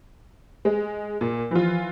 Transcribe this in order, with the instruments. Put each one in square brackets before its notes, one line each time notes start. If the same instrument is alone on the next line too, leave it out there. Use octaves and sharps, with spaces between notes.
[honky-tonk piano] G#3
A#2
[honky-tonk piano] E3 F4 [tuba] F3